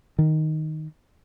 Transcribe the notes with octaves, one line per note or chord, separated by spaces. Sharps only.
D#3